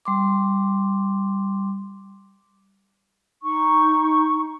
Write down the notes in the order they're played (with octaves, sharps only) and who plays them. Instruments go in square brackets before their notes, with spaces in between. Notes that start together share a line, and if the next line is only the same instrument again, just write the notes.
[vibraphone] G3 C6 D6
[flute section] D#4 C#6